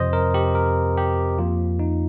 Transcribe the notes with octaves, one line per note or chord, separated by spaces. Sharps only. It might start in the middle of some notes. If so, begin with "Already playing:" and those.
Already playing: F2 C3 F3 C4 C5 D#5
A#4
G4
A#4
G4
F2 F3 A#3 F4
D#4